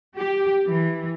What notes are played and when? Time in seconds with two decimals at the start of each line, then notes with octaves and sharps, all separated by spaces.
0.16 G4
0.68 E3